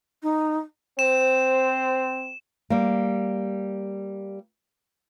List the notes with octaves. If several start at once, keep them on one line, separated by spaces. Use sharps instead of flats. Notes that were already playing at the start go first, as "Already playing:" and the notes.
D#4
C4 C5 E7
G3 A#3